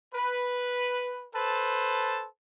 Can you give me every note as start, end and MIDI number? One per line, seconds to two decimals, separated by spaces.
0.14 1.25 71
1.34 2.25 69
1.34 2.25 71
1.34 2.25 72
1.34 2.25 81